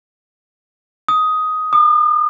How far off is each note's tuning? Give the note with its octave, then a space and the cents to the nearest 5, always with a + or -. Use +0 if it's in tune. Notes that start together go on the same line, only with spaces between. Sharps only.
D#6 +10
D#6 -45